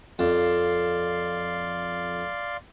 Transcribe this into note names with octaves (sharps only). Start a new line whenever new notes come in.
F2 D5 F5 C6